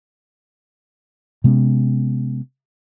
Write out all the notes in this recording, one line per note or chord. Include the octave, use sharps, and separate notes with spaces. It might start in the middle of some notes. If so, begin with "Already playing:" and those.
C3 G#3 B3 C#4